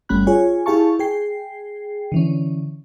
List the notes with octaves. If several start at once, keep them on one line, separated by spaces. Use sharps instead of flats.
G1 G3 A3 C#4 B5 F#6
F4 G#4 C#5 G#5
E4 G4 G#4 F5 A5 C#6
G#4 G5 C7
D3 E3 C#4